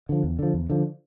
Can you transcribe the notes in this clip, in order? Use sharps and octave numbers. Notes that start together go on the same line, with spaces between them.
D3 F3
E2
D3 F3
E2
D3 F3